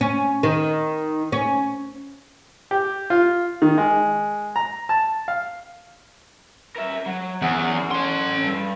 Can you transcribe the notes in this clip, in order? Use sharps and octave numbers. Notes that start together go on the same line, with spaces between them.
C#4
D#3
C#4
G4
F4
D#3
G#3
A#5
A5
F5
A#4 E5
F#3
E2 C#4 F#5
A4 C6
G2